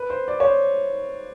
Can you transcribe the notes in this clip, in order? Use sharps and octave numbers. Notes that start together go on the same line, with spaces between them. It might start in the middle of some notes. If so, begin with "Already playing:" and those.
Already playing: B4
C5
D5
C#5
C5